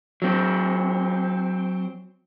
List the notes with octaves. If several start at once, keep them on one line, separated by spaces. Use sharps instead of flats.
F#3 C4